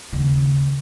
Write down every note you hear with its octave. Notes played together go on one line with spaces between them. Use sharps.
D#2 C#3